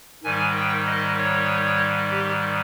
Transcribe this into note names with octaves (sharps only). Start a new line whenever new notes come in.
G#2 D#3 G3 G#5
G5
D#5
C#5
G4